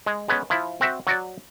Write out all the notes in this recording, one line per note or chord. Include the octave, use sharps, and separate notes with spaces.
G#3
G#3 B3 C#4
F3 E4
C4 F#4 E5
F#3 F#4 D5